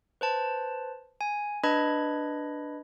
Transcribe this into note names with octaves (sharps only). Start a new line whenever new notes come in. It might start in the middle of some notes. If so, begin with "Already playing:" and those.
B4 C5 A5
G#5
D4 B4 D#5 B5 G#6